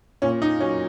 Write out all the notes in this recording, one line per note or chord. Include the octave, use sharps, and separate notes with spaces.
A#2 C#4
D#4
F#3 C#4